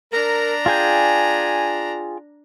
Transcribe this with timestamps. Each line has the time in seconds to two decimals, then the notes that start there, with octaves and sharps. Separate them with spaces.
0.12 D4 A#4 A#5
0.66 F4 G#4 G5 G#5